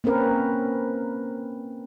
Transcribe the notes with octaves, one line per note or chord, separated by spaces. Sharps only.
A#3 C4 C#4 A#4 B4